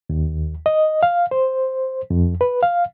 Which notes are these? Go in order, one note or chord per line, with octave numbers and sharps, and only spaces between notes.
D#2
D#5
F5
C5
F2
B4
F5